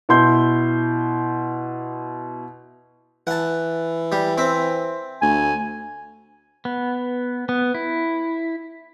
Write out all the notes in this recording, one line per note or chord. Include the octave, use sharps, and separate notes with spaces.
B2 E4 C6 G6
E3 F#5 A5
G3
C4 E5
D2 G#5
B3
B3
E4